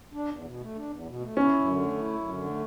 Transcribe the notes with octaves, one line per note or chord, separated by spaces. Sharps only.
D4
E2
B2
A3
D4
E2
B2
A3
C#4 E4
F#2
D3
A3
E4
F#2
D3
A3